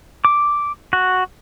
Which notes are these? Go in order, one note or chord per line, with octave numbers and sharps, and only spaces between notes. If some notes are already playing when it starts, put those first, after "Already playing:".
D6
F#4